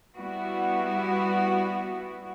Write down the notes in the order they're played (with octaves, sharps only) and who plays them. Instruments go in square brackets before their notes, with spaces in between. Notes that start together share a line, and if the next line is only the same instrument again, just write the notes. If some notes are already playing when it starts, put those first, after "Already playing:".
[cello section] G3 B3 E4 F#4